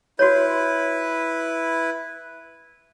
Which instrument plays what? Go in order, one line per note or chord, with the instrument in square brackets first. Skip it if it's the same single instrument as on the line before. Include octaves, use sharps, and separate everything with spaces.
[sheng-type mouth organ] E4 B4 [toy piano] F#4 C#5